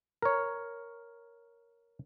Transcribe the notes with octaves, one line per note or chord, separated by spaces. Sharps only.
A#4 C#5